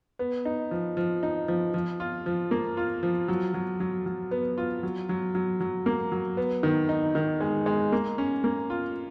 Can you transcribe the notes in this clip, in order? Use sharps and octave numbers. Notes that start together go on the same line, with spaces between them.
B3
D#4
F3
F3
D#4
F3
F3
F4
F3
A#3
F4
F3
F#3
F#3
F#3
F#3
B3
F4
F#3
F#3
F#3
F#3
A#3
F#3
B3
D#3
D#4
D#3
G#3
G#3
A#3
C#4
A#3
F4